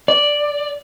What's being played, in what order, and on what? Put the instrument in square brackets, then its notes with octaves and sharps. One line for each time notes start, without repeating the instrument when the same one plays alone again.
[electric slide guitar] D5